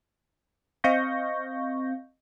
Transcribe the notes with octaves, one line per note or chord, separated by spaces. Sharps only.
C4 D#5 F5 C#6 G6 A#6